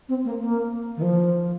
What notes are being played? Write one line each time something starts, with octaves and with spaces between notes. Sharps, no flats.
C4
A#3
A#3
D#3
F3